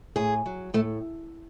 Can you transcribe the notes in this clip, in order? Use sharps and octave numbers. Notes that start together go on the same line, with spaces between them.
A2 G#4
F#3
A2 A3